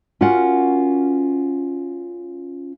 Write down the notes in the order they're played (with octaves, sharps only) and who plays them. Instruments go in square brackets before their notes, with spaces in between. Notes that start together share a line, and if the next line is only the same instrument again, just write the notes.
[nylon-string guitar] C#4 F4 F#4 A#4 F#5